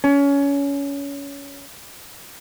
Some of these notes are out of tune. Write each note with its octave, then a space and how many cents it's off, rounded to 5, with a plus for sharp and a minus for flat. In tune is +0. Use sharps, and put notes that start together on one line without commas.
C#4 +25